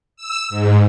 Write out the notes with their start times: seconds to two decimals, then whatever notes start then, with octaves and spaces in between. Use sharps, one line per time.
0.16 E6
0.50 G#2